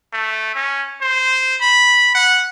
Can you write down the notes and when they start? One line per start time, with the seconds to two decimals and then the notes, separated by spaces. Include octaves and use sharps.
0.13 A3
0.55 C#4
1.01 C5
1.61 B5
2.15 F#5